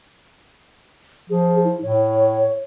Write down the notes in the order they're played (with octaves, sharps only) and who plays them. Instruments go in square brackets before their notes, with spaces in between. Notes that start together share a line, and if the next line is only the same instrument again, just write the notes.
[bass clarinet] F3 [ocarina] G#4
[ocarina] E4
[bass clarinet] A2 [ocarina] C#5